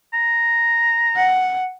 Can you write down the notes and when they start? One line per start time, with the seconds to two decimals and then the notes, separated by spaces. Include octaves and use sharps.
0.13 A#5
1.16 F#5